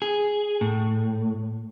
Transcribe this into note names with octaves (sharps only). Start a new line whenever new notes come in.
G#4
A2